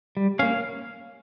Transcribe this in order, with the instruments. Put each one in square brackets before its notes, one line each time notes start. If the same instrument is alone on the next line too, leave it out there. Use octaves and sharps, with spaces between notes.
[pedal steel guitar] G3
A#3 C#4 F5